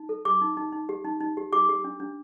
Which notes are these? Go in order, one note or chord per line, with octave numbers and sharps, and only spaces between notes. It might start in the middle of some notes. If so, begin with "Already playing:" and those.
Already playing: D#4
A4
G4 D6
D#4
D#4
D#4
G4
D#4
D#4
G4
G4 D6
G4
D4
D4